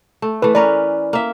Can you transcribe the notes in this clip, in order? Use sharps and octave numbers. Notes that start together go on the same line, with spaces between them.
A3
E3 A3 B4
C#4 A#4 B4 D5
A#3 E5